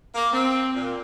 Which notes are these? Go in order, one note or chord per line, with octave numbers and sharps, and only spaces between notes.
A#3
C4
A#2